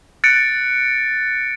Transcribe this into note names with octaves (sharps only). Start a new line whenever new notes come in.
F#6 A6 C#7 D7